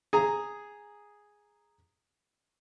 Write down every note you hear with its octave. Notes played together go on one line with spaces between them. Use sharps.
G#4 A#5